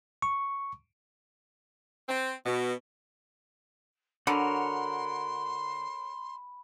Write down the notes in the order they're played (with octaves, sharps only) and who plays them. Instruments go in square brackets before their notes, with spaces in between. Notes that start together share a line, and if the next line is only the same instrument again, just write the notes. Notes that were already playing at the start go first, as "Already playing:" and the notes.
[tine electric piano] C#6
[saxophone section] C4
B2
[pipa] D3 [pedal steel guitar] F#4 A#4 C#5 [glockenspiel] B5 [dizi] C6